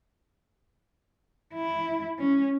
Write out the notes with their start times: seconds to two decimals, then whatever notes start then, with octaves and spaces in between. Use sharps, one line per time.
1.54 E4
2.19 C#4